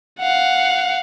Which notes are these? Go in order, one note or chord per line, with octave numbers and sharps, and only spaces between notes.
F5 F#5